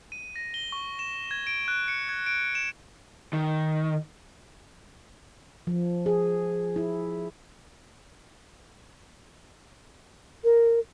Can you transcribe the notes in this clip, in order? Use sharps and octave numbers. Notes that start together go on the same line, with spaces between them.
D#7
A#6
G7
C#6
E7
G#6
D7
F#6
C#7
G#6
D7
E7
D#3
F3
G#4
E4
A#4